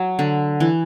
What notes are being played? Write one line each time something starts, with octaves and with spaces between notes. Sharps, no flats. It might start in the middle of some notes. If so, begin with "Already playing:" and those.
Already playing: F#3
D3
E3